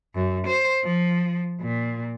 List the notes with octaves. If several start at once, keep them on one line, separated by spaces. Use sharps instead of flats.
F#2
C5
F3
A#2